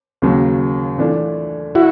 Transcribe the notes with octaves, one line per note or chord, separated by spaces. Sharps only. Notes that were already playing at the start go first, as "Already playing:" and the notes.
D#2 C#3 F#3
E3 A3 D4 F4
E4 F#4